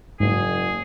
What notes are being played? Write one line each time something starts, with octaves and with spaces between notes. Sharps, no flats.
F#1 G#2 G#4